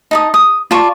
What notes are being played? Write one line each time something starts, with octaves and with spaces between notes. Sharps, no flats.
D#4 A5 D#6
D#6
F4 D5 A5 C#6